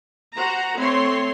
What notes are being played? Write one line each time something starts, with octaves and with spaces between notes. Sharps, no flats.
F#4 C5 F#5 A#5
A3 C4 C#5 C6